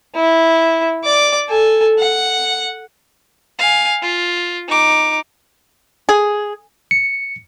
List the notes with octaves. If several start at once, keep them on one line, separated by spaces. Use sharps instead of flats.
E4
D5 D6
A4 G#5
F#5
F5 G#5
F4
D#4 D6
G#4
C#7